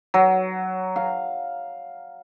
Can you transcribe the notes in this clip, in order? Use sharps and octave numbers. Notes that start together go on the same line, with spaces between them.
F#3
F5